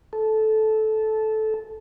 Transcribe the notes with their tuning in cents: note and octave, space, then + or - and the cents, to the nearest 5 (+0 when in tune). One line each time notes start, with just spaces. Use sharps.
A4 -15